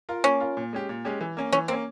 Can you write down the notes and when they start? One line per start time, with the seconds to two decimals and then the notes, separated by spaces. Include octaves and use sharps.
0.09 F4 A#4
0.24 A#3 C#4
0.40 F4 A#4
0.57 A#2
0.73 G#3 C#4 G4
0.89 A#2
1.05 G#3 C#4 G4
1.21 E3
1.37 A#3 C#4
1.52 E3 C#4
1.68 A#3 C4 C#4